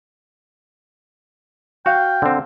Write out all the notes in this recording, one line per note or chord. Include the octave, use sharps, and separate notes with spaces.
F#4 F5 G5 F6
D3 C4